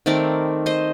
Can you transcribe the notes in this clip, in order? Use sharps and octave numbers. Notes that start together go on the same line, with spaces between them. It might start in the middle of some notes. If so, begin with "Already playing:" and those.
D#3 A3 C4 A#4 D5
C5 D#5